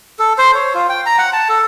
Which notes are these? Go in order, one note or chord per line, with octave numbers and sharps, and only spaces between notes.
A4
C5
C#5
F4
G5
A#5
F#5
A5
A4